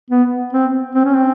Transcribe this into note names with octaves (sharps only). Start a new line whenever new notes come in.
B3
C4
C4
C#4
C4